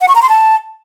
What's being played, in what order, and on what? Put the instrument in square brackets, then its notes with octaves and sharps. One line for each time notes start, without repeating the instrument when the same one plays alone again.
[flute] F#5
C#6
A#5
C6
A5